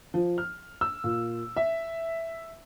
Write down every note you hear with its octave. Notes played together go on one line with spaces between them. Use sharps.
F3
F6
E6
A#2
E5